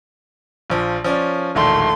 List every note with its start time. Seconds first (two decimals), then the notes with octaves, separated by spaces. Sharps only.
0.70 A#1 F3
1.04 F3 C#4 D5
1.55 E1 A#1 D#3 A3 C6